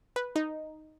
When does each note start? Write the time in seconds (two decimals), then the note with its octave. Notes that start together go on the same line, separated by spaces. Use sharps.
0.16 B4
0.36 D#4